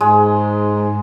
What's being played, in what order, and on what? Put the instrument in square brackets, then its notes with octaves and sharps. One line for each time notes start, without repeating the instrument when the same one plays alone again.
[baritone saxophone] G#2 [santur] G#3